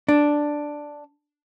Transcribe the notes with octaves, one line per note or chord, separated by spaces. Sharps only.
D4